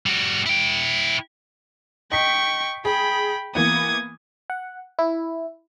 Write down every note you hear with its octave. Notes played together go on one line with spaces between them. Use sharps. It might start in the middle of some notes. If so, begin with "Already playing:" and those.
G3 F#4
E4 G5
D#5 G5 C#6 B6
G#4 G5 B5
E3 A#3 B3 D#6 G#6
F#5
E4